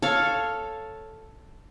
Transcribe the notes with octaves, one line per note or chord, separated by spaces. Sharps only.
A4 C#5 F5